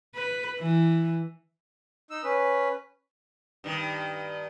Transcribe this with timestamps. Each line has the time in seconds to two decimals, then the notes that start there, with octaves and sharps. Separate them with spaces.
0.15 B4
0.59 E3
2.10 D#4 E6
2.24 C#4 B4
3.64 G2 D#3